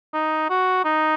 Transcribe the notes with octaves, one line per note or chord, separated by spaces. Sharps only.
D#4
F#4
D#4